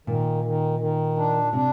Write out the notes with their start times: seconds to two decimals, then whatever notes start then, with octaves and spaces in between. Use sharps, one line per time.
0.07 A#2 D#3
0.44 D#3
0.80 D#3
1.17 D4
1.53 C3 D4